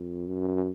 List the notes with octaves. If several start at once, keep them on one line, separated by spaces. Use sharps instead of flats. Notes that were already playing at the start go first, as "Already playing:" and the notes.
Already playing: F2
F#2